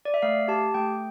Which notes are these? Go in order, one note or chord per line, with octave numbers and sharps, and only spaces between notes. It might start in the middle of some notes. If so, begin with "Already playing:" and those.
D5
E5
A3 F5
G4 A5
A3 G5